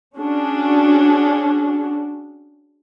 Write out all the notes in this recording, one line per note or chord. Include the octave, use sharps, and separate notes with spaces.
C#4 D4 F#4 G#4